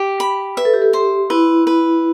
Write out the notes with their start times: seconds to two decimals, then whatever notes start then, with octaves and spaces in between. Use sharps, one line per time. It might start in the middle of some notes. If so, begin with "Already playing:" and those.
Already playing: G4
0.20 B5
0.57 B4 E5
0.65 A4
0.74 G4
0.82 A4
0.93 G4 C5
1.30 E4 B4
1.67 B4